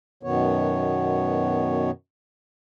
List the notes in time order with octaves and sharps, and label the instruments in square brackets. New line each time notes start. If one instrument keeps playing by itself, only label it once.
[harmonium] F#2 B2 D#3 B3 C#5